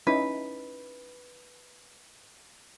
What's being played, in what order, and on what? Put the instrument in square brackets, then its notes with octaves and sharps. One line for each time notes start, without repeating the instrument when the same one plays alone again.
[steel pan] C#4 D#4 E4 [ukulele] B4